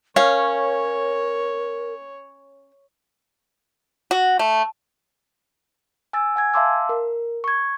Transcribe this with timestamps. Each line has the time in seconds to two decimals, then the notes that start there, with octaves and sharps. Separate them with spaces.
0.16 C#4 A#4 C#5 F5
4.11 F#4
4.39 A3
6.13 G#5 E6 A6
6.36 F#5 G#5 G#6
6.54 E5 F5 A5 C6 D6 E6
6.89 A#4
7.44 C#6 G#6